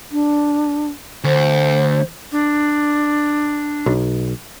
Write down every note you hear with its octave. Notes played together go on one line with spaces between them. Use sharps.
D4
D2 C5
D4
B1